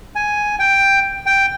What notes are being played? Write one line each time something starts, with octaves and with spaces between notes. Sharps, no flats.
G#5
G5
G5